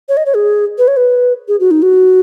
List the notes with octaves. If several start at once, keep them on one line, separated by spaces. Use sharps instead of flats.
C#5
D#5
C#5
G#4
B4
C#5
B4
G#4
F#4
D#4
F#4